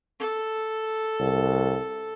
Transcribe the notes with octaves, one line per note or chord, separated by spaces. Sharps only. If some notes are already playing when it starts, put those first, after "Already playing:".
A4
C2